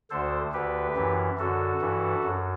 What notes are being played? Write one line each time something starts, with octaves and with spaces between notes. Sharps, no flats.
D2 D3 A4 C5
D2 D3 G4 B4
F#2 E3
F#2 D3 F#4 A4
G2 E3
F#2